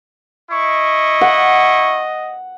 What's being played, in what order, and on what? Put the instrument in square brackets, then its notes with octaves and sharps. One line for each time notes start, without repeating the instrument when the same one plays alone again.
[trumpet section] E4 C#6 [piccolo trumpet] D#5
[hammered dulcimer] F#5